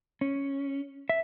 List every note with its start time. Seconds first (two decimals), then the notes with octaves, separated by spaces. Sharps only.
0.21 C#4
1.09 E5